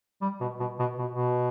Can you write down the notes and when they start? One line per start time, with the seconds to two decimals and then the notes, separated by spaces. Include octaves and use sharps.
0.21 G3
0.40 B2
0.60 B2
0.79 B2
0.98 B2
1.12 B2